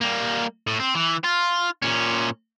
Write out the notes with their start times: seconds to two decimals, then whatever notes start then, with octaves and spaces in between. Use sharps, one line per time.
0.01 G3 A#3
0.67 A2
0.80 C4
0.95 E3
1.24 F4
1.82 A#2 C#4